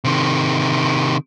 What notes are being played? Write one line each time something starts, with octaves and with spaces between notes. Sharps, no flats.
C3 D#3